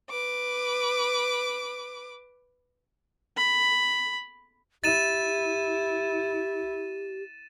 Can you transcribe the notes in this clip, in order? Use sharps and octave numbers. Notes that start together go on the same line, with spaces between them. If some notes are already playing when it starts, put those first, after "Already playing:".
B4 D6
B5
E4 G4 A6 D#7 E7